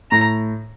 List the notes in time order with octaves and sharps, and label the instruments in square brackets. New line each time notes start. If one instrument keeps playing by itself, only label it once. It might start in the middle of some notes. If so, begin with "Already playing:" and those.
[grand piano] A2 [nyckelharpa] A#5